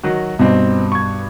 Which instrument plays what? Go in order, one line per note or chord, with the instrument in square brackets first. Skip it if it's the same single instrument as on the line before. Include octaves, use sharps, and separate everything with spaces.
[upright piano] D#3 F#3 F#4
[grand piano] G2 B2 [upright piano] C4 D#4
[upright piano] C#6 G#6